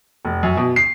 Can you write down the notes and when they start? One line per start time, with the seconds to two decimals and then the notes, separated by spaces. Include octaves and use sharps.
0.25 F1
0.43 F#2
0.57 B2
0.76 C7